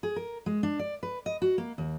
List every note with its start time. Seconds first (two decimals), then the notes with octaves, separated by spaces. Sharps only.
0.03 G#4
0.16 A#4
0.46 G#3
0.63 D4
0.79 D5
1.03 B4
1.26 D#5
1.42 F#4
1.58 A#3
1.78 D#2